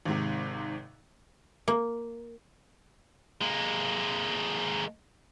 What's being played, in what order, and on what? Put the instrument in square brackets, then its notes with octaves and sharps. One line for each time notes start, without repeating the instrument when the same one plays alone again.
[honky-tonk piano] G#1 G#2 C3
[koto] A#3
[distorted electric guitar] G#3 A#3